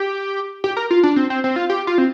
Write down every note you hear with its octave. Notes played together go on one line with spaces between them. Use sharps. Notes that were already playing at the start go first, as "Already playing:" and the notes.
Already playing: G4
G4
A#4
F4
D4
C4
C4
C4
F4
G4
F4
C4